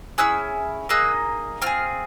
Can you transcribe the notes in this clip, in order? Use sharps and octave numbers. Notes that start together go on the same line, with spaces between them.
C#4 E4 G#4 E6 F#6
A#3 D#4 G#4 E6 F#6
C4 F4 G#4 F6